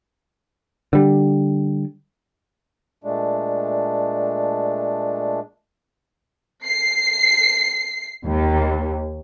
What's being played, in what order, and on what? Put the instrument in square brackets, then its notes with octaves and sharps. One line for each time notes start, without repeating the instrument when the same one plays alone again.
[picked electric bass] D3 G3
[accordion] A#2 G#3 A3 D4
[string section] C7
D#2